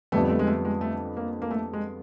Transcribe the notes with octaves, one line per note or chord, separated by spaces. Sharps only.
F2 D3 G3 A3 B3
A3
G#3
A3
G#3
A3
A#3
A#3
A3
G#3